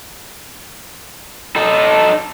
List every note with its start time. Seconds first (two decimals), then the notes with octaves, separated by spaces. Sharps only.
1.56 D#4 A4